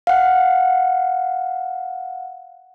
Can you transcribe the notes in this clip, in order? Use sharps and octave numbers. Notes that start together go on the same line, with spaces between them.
F5 F#5